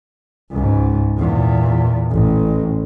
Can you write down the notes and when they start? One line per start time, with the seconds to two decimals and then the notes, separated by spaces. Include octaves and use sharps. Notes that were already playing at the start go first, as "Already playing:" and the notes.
0.52 C#2 G#2
1.17 E2 A#2
2.11 A1